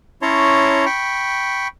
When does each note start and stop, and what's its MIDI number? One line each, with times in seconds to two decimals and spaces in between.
0.22 0.85 61
0.22 0.85 64
0.22 0.85 73
0.22 0.85 81
0.22 0.85 82
0.22 0.85 84
0.86 1.68 79
0.86 1.68 83
0.86 1.68 85